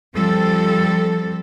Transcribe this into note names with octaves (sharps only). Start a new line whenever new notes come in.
F3 G3 C4 A4